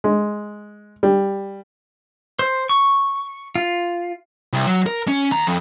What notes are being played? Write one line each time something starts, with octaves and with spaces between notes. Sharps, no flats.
G#3
G3
C5
C#6
F4
C2
F#3
A#4
C#4
D#2 A#5
F2